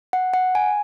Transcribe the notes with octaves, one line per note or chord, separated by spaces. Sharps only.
F#5
F#5
G#5